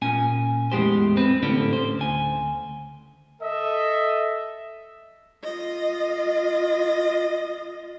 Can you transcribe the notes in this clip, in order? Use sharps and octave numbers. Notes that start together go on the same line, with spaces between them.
A#2 C#4 G#5
E2 A2 E3 G#3 G4 C5
C4 B4
A2 D3 C#4 D4
C5
D2 G#5
A4 D#5 E5
F4 D#5